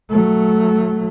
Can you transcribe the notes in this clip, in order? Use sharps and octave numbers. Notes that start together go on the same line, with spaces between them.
F#3 A3